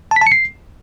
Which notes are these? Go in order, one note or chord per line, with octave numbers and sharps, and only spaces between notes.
A5
B6
A5
C#7
C7